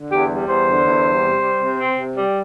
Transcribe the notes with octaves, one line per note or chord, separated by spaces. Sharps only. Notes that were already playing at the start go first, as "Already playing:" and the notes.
Already playing: D3
E2 G4
G3
E2 C5
D3
E2
G3
C3
G3
C3
C4
C3
G3